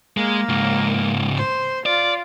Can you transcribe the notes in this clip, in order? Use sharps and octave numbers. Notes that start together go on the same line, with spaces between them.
G#3 A#3
C#2 G#2
C5
F4 D5